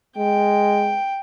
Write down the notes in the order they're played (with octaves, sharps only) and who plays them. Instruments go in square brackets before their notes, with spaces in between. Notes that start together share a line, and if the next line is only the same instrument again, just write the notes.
[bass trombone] G#3 [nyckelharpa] G5